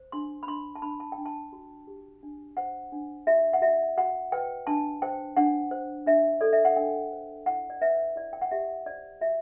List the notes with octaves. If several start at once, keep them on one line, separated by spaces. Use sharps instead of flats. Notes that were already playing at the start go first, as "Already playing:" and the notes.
Already playing: C5
D4 C6
B5
D4 C6
A5
D4 B5
A5
G5
D4
A5
F#4
G4
D4
C5 F#5
D4
F#4 E5
F#5
F#4 E5
F#4 F#5
B4 G5
D4 A5
C5 G5
D4 F#5
C5
D4 E5
A4 D5
E5
F#5
D4 G5
C5
E4 F#5
D5
B4 E5
E4 D5
G5
F#5
G4 E5
C5 D5
F#4 E5